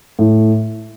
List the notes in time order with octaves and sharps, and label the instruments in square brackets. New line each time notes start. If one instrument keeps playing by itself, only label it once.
[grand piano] A2